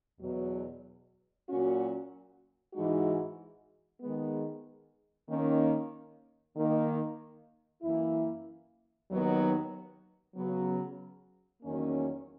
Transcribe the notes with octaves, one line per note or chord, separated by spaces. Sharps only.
E2 B2 F#3
A#2 F#3 C#4 F#4
G#2 E3 G#3 D#4 F#4
D#3 G#3 B3
D#3 A#3 C#4
D#3 A#3 D#4
F#2 E3 A#3 E4
D#2 D#3 F#3 B3
C#3 F#3 B3
E2 D#3 F#3 A#3 C#4